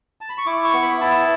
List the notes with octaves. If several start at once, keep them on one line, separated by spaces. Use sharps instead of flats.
A5
B5
C#6
E4 D6
C#6
B3
B5
E4 A5